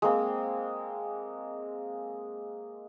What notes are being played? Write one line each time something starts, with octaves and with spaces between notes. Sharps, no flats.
G#3 A#3 C4